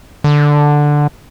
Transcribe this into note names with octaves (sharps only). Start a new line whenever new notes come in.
D3